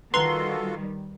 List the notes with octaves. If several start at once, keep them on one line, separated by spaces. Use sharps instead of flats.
D#3 G3 F4 F#4 A4 B4 A#5 C6